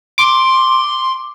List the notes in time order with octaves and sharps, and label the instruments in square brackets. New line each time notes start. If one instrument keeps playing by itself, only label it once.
[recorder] C6 [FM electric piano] D6